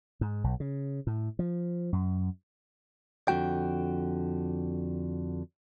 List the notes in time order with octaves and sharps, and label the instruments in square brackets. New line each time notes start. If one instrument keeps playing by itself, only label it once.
[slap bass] G#2
B1
C#3
A2
F3
F#2
[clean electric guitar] F2 D3 F#3 F#4 G5